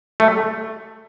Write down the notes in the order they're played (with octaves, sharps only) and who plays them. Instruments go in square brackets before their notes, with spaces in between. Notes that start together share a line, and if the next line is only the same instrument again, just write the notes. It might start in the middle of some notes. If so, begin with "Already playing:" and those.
[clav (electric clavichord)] A3